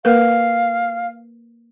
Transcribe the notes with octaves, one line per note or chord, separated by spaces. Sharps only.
A#3 A#4 B4 F5